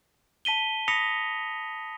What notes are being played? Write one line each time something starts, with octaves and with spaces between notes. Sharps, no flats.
A5 B6 D#7 G7
B5 D#6 A#6 B6 C#7 F7